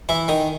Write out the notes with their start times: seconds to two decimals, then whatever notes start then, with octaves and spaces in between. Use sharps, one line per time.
0.09 E3 E4
0.28 D#3 D#4